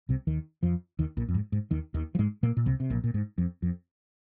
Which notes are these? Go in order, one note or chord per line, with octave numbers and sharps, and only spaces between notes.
C2 C3
D#2 D#3
F2 F3
D#2 D#3
A#1 A#2
F2
G#2
G#2
D#2 D#3
D#2 D#3
F3
G#2 G#3
A#2 A#3
A#2
C2 C3
C3
A#1 A#2
A#2
G#2
F2
F2